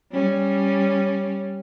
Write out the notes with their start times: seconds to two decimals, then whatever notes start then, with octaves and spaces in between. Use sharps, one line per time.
0.12 G3 C#4